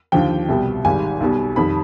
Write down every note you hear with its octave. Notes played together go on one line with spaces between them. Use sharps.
D#2 D3 F3 G5
C2 B2 G3
G#1 G#2 D#3 G3 G#5
B1 B2 G3
F2 D#3 G3 B5